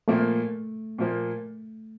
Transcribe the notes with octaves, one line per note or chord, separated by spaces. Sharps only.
A#2 F3 A3 A#3
A#2 F3 A#3